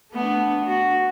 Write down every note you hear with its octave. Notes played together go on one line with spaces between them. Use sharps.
A3 B3 D4
F#4